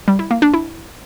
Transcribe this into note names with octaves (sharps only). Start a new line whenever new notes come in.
G3
E4
A#3
D4
E4